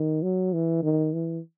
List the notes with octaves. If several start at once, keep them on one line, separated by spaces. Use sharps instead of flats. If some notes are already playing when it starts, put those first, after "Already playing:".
Already playing: D#3
F#3
E3
D#3
E3